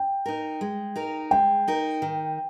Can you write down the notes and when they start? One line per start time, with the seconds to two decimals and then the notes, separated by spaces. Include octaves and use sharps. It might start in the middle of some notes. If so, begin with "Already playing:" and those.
Already playing: G5
0.26 D#4 A#4
0.61 G#3
0.96 D#4 A#4
1.31 G#3 G5
1.68 D#4 A#4
2.02 D#3